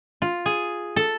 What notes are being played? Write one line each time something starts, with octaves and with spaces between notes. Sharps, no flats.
F4
G#4
A4